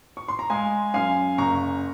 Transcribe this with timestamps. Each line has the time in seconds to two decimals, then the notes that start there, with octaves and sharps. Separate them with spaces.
0.17 C#6
0.28 C6
0.39 A#5
0.50 G#3 F5 G#5
0.94 F#2 F5 G#5
1.38 F#1 A#5 C#6